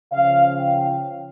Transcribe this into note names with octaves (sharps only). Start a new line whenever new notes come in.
C#3 F3 C#4 F5
G5